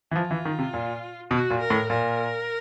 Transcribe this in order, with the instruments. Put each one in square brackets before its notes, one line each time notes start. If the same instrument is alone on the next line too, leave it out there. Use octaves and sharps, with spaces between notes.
[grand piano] E3
[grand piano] F3 [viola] F4
[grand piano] E3
D#3
C3
A#2
[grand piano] B2 [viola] F#4
[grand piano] A#2
[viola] A#4
[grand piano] A2
[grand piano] A#2 [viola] A#4